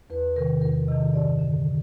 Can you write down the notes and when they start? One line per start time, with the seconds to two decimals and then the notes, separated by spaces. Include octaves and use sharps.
0.10 E2 B4
0.36 C3 D#3 A#4
0.61 E2 A#4
0.88 C3 D#3 D#5
1.13 G2 D5
1.39 D3